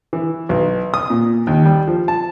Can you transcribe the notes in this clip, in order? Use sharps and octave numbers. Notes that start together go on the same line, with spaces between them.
E3
B1
D#6
A#2
D#2
G3
F3
A5